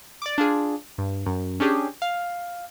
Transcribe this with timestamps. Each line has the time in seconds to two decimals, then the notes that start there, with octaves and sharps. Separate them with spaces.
0.22 D5 D6
0.38 D4 F4 G#4
0.98 G2
1.26 F#2
1.60 C#4 D4 G4 G#4
2.02 F5